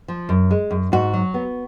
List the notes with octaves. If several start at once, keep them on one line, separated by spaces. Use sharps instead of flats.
F3
F#2
G#3
F#2
G#2 F#4
F#3
B3